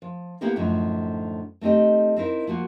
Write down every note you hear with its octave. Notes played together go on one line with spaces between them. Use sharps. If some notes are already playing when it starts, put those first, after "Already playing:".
F3
A#3 B3 E4 G4 A4 A#4
F#2 A2 D3 F3 D#4
A3 C4 D#4 G4 D#5
C4 D#4 E4 A#4
F3 A#3 F#4